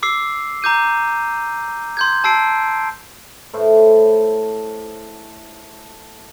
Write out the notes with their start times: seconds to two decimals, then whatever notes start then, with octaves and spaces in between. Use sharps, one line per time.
0.03 D6 E6 C7
0.63 A#5 D6 G6 D#7
1.97 C6 G6 G#6
2.24 A5 E6 C7 D7
3.53 A2 A3 C5